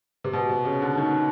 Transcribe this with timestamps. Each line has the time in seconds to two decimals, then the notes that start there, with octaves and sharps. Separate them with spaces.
0.24 C3
0.33 B2
0.49 C3
0.65 C#3
0.82 D3
0.98 D#3